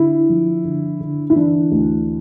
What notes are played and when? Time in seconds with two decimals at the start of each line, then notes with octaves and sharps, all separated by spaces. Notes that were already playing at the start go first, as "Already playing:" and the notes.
Already playing: D3 E4
0.29 F3
0.65 D3
1.00 D3
1.30 E4
1.36 E3 D4
1.71 D2